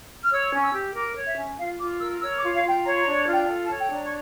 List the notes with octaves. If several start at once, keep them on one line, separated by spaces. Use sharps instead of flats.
F6
C#5 E6
C#4
E6
G4
A#4 D6
C#5
E5
C#4
F4 F5
F4 D6
A#4 E6
C#5 E6
D6
F4
F5
F4 G5
C#5 A#5
A#5
D4
F4
G5
A4
A5
C#5
G5
D4
A#5
C#6